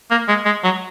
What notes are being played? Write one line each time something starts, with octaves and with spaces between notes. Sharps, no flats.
A#3
G#3
G#3
F#3